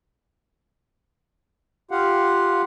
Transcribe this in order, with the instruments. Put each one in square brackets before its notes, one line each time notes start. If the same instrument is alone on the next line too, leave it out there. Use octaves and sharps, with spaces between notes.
[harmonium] F4 G4 F5 F#5